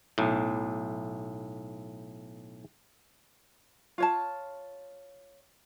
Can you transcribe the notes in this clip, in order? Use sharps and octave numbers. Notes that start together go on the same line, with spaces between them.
B1 A2
F4 C#5 A5